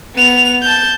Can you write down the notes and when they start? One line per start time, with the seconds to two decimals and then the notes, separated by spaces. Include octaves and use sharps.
0.15 B3 F7
0.62 A5 G6